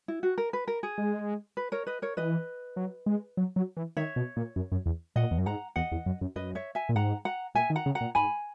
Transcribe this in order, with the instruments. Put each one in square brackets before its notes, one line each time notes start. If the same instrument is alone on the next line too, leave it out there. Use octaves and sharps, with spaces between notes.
[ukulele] E4
F#4
A#4
B4
A#4
G#4
[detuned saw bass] G#3
[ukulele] B4
A#4 C#5
B4 D#5
A#4 C#5
[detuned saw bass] E3 [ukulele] B4 D#5
[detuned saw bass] F#3
G#3
F#3
F#3
E3
[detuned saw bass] D#3 [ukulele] C#5 E5
[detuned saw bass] B2
A#2
F#2
F#2
E2
[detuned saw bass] A#2 [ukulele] D#5 F#5
[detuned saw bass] E2
F#2
[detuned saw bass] G#2 [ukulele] F#5 A#5
[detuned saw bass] E2 [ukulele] D#5 F#5
[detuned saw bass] E2
F#2
F#2
[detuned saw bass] F#2 [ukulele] B4 D#5
[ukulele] C#5 E5
E5 G#5
[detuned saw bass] A#2
[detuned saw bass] G#2 [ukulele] F#5 A#5
[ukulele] F#5 A#5
[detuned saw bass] A#2 [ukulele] E5 G#5
[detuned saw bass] D#3
[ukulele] F#5 A#5
[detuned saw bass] C#3
[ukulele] F#5 A#5
[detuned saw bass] A#2
[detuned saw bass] G#2 [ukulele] G#5 B5